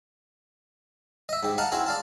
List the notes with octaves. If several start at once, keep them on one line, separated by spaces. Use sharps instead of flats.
D#5 E5
G#2 G4
D#5 F5 F#5 A5 A#5
C4 E4 F#4 G#4
D5 F5 A5